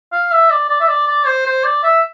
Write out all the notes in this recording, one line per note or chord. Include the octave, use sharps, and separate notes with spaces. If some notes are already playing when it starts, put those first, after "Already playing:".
F5
E5
D5
D5
E5
D5
D5
C5
C5
D5
E5